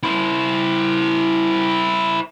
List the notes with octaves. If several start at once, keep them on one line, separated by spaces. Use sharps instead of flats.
E4 C5